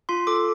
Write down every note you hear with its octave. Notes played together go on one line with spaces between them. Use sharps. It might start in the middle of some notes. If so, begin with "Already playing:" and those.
F4 C6
A4 D6